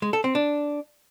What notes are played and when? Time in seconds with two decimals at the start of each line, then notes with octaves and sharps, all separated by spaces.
0.02 G#3
0.13 A4
0.24 C4
0.35 D4